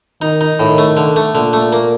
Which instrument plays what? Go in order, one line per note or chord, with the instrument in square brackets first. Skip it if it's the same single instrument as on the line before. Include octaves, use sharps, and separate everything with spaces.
[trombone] D#3 [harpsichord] D#4
[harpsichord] D#4
[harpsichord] A2 [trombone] D#3
[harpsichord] A3
D3
A3
[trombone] A#2 [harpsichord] D3
[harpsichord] A3
A#3